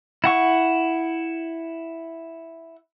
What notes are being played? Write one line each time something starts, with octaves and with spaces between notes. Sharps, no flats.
E4 F#5 C#6